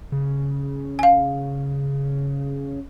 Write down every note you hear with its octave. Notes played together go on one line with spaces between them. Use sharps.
C#3
F5 G#5